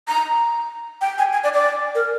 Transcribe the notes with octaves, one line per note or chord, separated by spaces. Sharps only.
A#5
G5
G#5
G#5
D5
D5
A#4